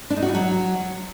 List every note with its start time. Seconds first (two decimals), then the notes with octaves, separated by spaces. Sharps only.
0.10 D4
0.16 D#4
0.22 F#4
0.29 G3
0.35 F#3